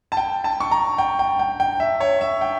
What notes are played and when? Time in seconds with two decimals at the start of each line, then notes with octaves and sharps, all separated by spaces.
0.12 A5
0.17 G5
0.44 A5
0.60 C#6
0.71 A#5
0.98 G5
1.19 G5
1.39 G5
1.60 G5
1.80 E5
2.00 C#5
2.21 E5
2.41 G5